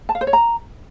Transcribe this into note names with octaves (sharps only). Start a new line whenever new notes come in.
A5
F5
C5
C#5
A#5